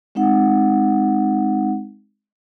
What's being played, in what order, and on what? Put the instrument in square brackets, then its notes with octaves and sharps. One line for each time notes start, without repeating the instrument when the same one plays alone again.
[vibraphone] G#3 C4 D#4 F#5